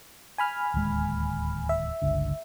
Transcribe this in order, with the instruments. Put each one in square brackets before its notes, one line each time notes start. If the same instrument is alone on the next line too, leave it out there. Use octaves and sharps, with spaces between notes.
[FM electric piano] G#5 B5 F6
[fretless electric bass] D1 D#2 G#3
[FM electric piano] E5
[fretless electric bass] G1 C#2 D3